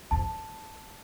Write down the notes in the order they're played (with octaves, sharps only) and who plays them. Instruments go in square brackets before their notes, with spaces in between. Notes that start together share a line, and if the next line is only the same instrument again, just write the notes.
[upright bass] F2 [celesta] A5